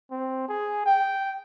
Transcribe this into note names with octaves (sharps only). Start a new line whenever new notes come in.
C4
G#4
G5